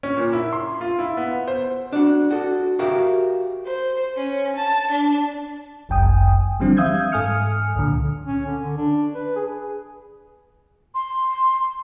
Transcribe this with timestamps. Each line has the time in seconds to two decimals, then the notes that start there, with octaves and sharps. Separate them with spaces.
0.03 C#4
0.17 A#2
0.33 E4
0.53 C6
0.81 F4
0.99 E4
1.17 B3
1.48 C5
1.93 D4 F#4
2.31 F#4 A4
2.79 F#4 G4 A#4 E5 F5
3.66 C5
4.17 C#4
4.56 A5
4.92 D4
5.89 G1 C2 F#2 G5 G#5 D#6
6.60 D3 E3 F3 G3 C4 D4
6.77 E5 F5 D#6 E6 G6 G#6
7.12 G#2 A4 G#5 D#6 F6 C#7
7.76 C#2 A#2 D3
8.25 C#4
8.47 D3
8.60 D3
8.77 D4
9.15 B4
9.36 G#4
10.95 C6